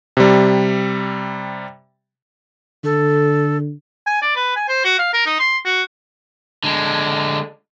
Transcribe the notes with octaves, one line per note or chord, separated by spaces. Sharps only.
C3 G3
D3 A4
G#5
D5
B4
G#5
C5
F#4
F5
A#4
D#4
C6
F#4
D3 G#3